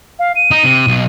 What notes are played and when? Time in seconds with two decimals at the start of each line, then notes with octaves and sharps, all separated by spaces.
0.19 F5
0.36 D#7
0.51 D#4
0.64 C3
0.87 B1